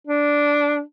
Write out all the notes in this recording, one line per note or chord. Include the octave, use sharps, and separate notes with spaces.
D4